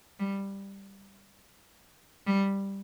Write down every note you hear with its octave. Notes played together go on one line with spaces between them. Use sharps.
G3
G3